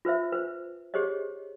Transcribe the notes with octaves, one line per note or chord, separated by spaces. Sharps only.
F4 B4 C5 E5
B4 C5
G4 G#4 C5 C#5 D#5